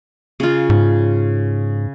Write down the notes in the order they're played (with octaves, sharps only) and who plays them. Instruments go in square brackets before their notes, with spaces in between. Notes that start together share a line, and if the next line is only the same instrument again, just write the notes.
[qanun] C#3 F4
[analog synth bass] G#2